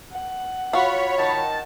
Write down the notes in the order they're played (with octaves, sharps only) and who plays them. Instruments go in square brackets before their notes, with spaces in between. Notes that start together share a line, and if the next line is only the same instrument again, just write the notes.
[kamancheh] F#5
[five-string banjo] F4 F#4 [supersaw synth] C#5 B5
[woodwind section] D#3 A5